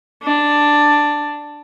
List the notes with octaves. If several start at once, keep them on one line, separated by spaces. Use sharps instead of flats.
D4